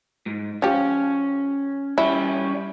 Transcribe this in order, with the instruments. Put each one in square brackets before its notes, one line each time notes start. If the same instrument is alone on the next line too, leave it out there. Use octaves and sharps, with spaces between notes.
[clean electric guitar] G#2
[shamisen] F3 G4 [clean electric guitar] C#4
[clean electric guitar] G3 C#4 [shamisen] E4